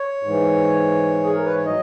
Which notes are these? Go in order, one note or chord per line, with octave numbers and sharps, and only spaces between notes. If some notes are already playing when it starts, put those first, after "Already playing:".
Already playing: C#5
G#2 E3
G#4
A#4
B4
C#5
F#3 D#5